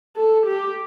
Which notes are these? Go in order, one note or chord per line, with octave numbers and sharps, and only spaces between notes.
A4
G4